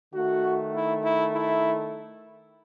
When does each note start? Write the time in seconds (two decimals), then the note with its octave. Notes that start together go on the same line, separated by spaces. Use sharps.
0.14 D#3 A3 F#4
0.74 E4
1.04 E4
1.33 E4